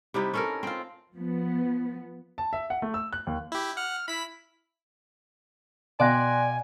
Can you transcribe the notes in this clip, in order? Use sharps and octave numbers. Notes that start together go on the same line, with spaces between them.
C3 G3 D#4 E4
C#4 A4 A#4
C4 F4
F3 B3
A5
E5
F#5
A3
E6
F#6
D#2
E4 G4
F#5 F6
E4 B5 B6
B2 D5 F5 G5 G#5 C6 F#6 A#6